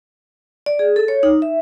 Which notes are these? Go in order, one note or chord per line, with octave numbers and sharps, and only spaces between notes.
D5
G#4
A4
C#5
D#4
E5